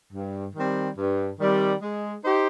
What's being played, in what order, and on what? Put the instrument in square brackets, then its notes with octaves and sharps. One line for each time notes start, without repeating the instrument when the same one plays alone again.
[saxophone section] G2
D#3 G3 C4
G2
D#3 G3 C4
G#3
D#4 G4 C5